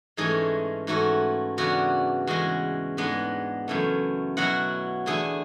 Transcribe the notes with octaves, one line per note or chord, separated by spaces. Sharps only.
G#2 E3 G#3 A3 C#4 G#4
G#2 E3 A3 C#4 E4 F#4
C#3 E3 B3 D4 F#4
E2 C#3 G#3 F#4
G#2 G#3 B3 D4 B4
F#2 C#3 E3 A3
B2 F#3 C#4 E4 F#4 F#5
E2 D3 A3 E4 G#4 G#5